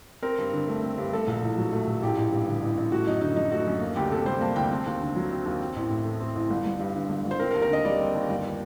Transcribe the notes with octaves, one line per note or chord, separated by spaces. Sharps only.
C4 A#4
G2
D3
A3
C4
G2
A3 A4
A#1
A2
F#3
A3
A#1
A1 G4
A1
G2
D3
A1
A1
A3 F#4
F#2 D#4
D3 D#4
F#3 D#4
A3 F#4
F#2
A#3
D2 G4
C3 A4
G3 C5
A#3 A5
D2 G5
C4
D#2
D3
F#3
C4
D#2
C4
A1
A2
A3
C4
A1
G1
G1
G2
D3
G1
G1
C5
C4 A#4
A#4
D#2
A#4
D3 D#5
G3 D5
C4
D#2
G1